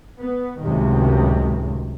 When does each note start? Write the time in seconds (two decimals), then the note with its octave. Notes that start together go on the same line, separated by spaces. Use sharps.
0.18 B3
0.61 C#2 F#2 A2 C3 D#3